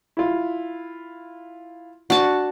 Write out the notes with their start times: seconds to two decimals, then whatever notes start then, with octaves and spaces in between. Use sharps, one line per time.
0.17 E4 F4
2.10 D4 F#4 A5